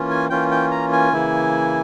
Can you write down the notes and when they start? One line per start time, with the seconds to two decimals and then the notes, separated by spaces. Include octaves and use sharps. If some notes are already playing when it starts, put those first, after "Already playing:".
Already playing: E3 A#3 C#4 F4
0.11 G#5
0.30 E3 A#3 C#4 F4 G5
0.51 G5
0.71 A#5
0.93 G#5
1.13 C#3 E3 A#3 E4